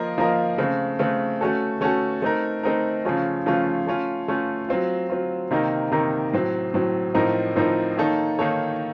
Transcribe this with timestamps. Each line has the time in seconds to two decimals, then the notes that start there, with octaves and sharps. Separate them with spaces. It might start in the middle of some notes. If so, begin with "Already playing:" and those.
Already playing: F3 A#3 F4 A#4 D#5
0.18 F3 A#3 F4 A#4 D#5
0.58 C#3 A3 C4
0.99 C#3 A3 C4
1.41 A3 C#4 F#4 A4
1.81 A3 C#4 F#4 A4
2.22 A3 C4 D#4 A#4
2.63 A3 C4 D#4 A#4
3.05 C#3 F3 A3 C#4 F4
3.46 C#3 F3 A3 C#4 F4
3.87 A3 C#4 F4
4.28 A3 C#4 F4
4.69 F#3 C4 F4
5.10 F#3 C4 F4
5.51 C3 D#3 A#3 D#4 A#4
5.92 C3 D#3 A#3 D#4 A#4
6.33 A2 F#3 C4
6.74 A2 F#3 C4
7.15 A2 F3 C4 D#4 A#4
7.56 A2 F3 C4 D#4 A#4
7.97 D#3 A#3 D#4 A4 C#5
8.39 D#3 A#3 D#4 A4 C#5